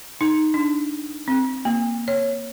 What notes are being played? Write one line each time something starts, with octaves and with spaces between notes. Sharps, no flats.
D#4
D4
C4
A#3
C#5